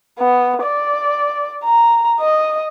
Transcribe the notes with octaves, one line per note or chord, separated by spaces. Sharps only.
B3
D5
A#5
D#5